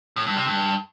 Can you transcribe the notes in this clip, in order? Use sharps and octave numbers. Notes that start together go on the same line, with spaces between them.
A2
G2
C3
G2